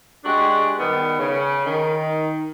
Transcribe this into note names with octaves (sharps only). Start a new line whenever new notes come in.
G#3 D4 F#4 G4
D#3 G3 B3
C#3
D#3